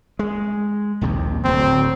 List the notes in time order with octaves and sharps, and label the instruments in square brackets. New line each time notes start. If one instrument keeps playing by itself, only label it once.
[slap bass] G#3
A#1 D#2 C3
[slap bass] D1 D2 [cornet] C4